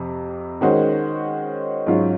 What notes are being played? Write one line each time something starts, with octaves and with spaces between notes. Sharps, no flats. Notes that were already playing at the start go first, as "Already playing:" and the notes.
Already playing: F2 C3
D#3 G#3 C#4 F#4 C5
G#2 F#3 C#4 F4